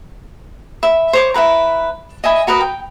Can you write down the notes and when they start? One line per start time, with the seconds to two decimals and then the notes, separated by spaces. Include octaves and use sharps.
0.83 E5 B5
1.13 C5 C#5 D6
1.34 E4 F#4 B4 A#5
2.24 D#5 E5 G#5 B5
2.47 F#4 A#4 B4 D#5
2.61 G5